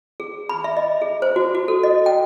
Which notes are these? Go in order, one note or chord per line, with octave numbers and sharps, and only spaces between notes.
G#4
B5
E5
D#5
G#4
C5
F#4
F#4
A4
D#5
G5